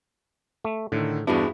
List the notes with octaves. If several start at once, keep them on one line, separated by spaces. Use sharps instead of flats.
A3
A2 D3 D#3
E2 G2 B3 D4 E4 F#4 G#4